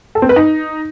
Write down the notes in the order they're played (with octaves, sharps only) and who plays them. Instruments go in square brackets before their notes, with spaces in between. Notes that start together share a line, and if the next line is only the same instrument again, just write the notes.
[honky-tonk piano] A4
C4
B4
D#4